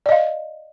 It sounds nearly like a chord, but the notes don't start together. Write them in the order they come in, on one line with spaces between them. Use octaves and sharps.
D5 D#5 F5